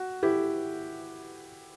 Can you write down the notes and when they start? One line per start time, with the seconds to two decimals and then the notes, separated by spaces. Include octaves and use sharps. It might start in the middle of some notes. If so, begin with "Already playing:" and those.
Already playing: F#4
0.23 E4 G4